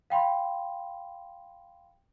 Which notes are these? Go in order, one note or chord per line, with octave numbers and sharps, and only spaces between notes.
F5 G5 B5 C6